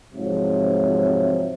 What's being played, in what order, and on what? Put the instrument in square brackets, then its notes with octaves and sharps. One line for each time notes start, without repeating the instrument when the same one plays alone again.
[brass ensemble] G#2 C3 F3 F#3